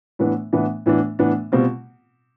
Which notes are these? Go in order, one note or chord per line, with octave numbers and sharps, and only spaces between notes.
A2 E3 B3 D4
A2 E3 B3 D4
A2 E3 B3 D4
A2 E3 B3 D4
B2 G3 C4 F4